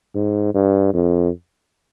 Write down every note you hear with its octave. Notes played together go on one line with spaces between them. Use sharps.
G#2
G2
F2